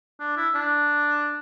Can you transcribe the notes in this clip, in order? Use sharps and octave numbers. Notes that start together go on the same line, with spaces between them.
D4
E4
D4